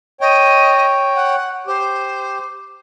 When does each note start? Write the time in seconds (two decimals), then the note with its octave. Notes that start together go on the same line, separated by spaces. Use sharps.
0.21 C#5 D#5 G5
1.15 F#5
1.67 G4 C5